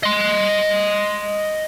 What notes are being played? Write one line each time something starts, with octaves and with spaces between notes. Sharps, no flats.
D#5 C6